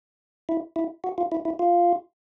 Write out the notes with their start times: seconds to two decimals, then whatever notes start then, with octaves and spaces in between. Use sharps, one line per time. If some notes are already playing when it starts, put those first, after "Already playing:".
0.49 E4
0.76 E4
1.04 F#4
1.18 F4
1.32 E4
1.45 E4
1.59 F4